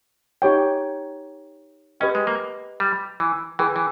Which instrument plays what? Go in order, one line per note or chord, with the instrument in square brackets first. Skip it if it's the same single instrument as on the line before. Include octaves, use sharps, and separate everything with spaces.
[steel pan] D#4 G4 C#5 G5
[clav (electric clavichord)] C#4 [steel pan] G4 B4 D#5 G5
[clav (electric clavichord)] G#3
A#3
G3
E3
[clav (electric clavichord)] E3 [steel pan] G#4 B4 G5 C#6
[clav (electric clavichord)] E3